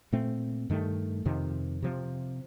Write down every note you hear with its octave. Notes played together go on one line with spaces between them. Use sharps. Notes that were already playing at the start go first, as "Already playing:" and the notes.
A#2 A3 C4
G2 D#3 A3
F2 C3 D#3
C3 F3 C4